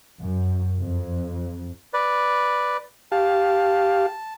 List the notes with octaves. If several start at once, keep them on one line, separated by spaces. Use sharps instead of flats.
F#2
F2
B4 D5
G4 F5 A5